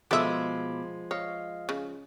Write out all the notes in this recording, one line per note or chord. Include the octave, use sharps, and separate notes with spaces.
B2 F3 G#3 A4 E5 B5 D6
C#5 D#5 F5
C#3